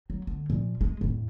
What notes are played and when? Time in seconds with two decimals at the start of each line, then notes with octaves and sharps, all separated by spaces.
0.10 F#3
0.27 D3
0.50 A#2 F3
0.81 G#3
1.01 E2 A2